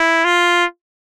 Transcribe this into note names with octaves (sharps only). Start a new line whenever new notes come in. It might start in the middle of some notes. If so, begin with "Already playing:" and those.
Already playing: E4
F4